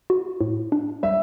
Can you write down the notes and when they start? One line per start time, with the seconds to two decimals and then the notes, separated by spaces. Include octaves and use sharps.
0.10 F#4
0.41 A2
0.72 D4
1.03 G3 E5